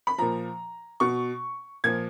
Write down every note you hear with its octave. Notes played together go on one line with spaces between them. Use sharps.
B5
A#2 F3 A#5
B2 C#6
A#2 F3 G#6